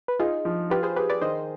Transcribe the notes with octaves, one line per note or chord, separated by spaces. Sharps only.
B4
D#4 F4 G#4
F3
F4 G4 B4
G#4 C5
G4 G#4 B4
B4 D5
D#3 C5 D#5